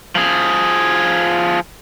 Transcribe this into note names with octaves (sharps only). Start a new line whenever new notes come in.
F3 G#4